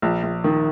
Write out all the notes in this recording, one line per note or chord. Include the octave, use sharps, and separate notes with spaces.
A#1
A#1
D#3